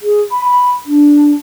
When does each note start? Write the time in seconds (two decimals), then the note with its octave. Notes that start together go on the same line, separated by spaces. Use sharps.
0.02 G#4
0.31 B5
0.45 B5
0.86 D4